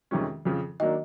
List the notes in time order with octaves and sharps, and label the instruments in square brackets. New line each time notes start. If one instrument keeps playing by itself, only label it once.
[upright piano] F2 C3 D#3 G#3 C#4
F2 C#3 F3
[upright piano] D#3 F#3 A#3 D4 [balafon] D#5